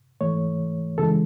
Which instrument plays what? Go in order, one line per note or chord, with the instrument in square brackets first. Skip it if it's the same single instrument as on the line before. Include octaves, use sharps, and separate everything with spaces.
[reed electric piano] G#2 E3 A3 C#5
F#2 C#3 E3 G#3 A4